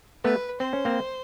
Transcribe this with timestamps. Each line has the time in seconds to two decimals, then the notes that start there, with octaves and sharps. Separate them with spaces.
0.24 A3 B3 B4
0.60 C4 C5
0.73 C#4
0.85 A#3 C4